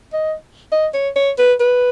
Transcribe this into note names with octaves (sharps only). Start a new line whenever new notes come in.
D#5
D#5
C#5
C#5
B4
B4